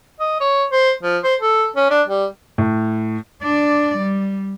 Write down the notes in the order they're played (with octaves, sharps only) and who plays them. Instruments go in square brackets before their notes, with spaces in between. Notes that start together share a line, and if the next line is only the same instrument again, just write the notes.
[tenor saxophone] D#5
C#5
C5
F3
C5
A4
C#4
D4
G3
[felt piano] A2
[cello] D4 D5
G3